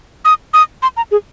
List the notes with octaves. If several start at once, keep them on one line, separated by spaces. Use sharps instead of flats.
D#6
D#6
C6
A#5
G#4